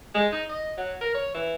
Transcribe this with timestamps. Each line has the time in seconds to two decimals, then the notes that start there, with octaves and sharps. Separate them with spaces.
0.15 G#3
0.32 D#4
0.49 D#5
0.78 F#3
1.01 A#4
1.14 C#5
1.34 E3